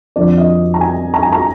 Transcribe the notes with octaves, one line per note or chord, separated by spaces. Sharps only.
F2 D3 F3 D5
D#5
A#5
G#5
A#5
G#5
A#5